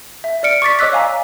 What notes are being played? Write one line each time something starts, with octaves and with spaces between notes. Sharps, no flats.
E5
D5 F6 C#7 D7
C#6 D6 A6 B6
C#5 D#5 D6 E6 F#6 B6
C#5 F5 G#5 A#5